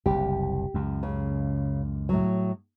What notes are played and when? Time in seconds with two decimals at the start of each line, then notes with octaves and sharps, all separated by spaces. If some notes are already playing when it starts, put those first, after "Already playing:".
0.06 F#1 C2 G4
0.74 C#2 F#2
1.03 C#3
2.09 A2 F#3